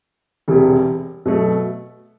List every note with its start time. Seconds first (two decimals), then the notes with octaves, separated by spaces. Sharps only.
0.48 E1 E2 C3 G3
1.26 B2 F#3 A3